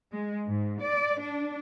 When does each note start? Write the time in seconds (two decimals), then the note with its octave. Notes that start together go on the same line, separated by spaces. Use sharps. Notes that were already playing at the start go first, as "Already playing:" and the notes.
0.13 G#3
0.46 G#2
0.80 D5
1.21 D4